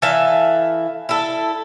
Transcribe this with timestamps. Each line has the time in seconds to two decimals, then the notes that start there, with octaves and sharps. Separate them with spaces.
0.02 E3 A4 E5 F5
1.09 E4 A4